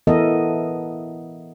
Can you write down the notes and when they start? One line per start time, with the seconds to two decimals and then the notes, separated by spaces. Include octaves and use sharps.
0.07 E3 A3 B3 A4 A#4 D#5